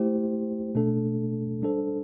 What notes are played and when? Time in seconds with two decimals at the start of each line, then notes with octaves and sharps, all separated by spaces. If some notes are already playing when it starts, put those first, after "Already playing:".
Already playing: A3 E4 G4 C5
0.75 B2 A3 D4 A4
1.62 G3 D4 A4 C5